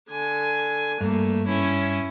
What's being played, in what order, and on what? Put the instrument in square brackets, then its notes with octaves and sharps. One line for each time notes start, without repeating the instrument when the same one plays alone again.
[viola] D3 G#5
[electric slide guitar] G2 [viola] A3 A#3
[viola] C#4 E4